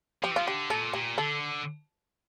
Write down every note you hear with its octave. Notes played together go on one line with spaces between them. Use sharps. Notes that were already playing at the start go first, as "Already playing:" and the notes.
F3 G4
E3
F3 F4
D3 G4
A#2 A4
A#2 G4
D3 A4